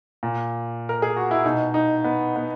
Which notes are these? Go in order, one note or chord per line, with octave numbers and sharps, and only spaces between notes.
A#2
A#4
G#4
F#4
E4
B2 D#4
D#4
B3
B3